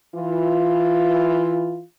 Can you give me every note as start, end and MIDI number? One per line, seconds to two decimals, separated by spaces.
0.15 1.81 52
0.15 1.81 65